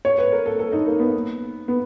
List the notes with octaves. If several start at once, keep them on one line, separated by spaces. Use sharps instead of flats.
C#5
B4
A#4
A4
A4
D#4
A#3
B3
B3